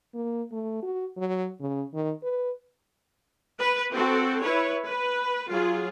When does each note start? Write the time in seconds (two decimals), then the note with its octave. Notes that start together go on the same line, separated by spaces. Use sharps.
0.14 A#3
0.52 A3
0.83 F#4
1.17 F#3
1.60 C#3
1.94 D#3
2.23 B4
3.59 B4
3.93 C4 F#4 A4
4.42 E4 B4 C#5
4.88 B4
5.49 F#3 F4 G#4